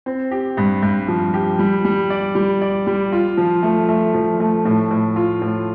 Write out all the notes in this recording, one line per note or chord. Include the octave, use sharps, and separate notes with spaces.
C4
G4
G2
G2
F3
G4
G3
G3
D5
G3
D5
G3
F4
F3
A3
A3
F3
A3
A2
A2
F4
A2